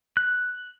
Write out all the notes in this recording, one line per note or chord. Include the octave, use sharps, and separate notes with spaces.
F#6